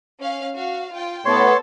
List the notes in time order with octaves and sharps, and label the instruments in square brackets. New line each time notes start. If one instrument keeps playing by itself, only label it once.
[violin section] C#4 F5
F#4 F5
F4 G5
[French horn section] A2 B3 [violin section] A4 [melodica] C#5 C6